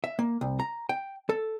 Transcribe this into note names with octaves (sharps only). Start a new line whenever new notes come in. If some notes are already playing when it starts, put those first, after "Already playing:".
E5
A#3
C2
A#5
G5
A4